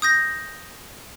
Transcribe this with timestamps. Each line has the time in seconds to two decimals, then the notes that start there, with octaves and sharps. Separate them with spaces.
0.02 D#6 G6 A#6